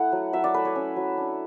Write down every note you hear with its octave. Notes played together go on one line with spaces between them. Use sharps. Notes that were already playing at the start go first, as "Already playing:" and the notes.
Already playing: A3 E4 F#5
F#3
F#3 E5
D5
A3 B4
C#5
C#4
F#3
D4